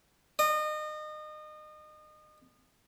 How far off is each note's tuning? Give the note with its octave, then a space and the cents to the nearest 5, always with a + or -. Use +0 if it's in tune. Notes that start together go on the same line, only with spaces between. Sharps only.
D#5 -30